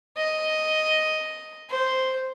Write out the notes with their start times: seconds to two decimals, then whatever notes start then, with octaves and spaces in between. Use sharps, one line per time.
0.17 D#5
1.70 C5